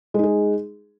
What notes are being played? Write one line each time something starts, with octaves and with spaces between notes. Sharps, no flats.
G#3 D#4 G#4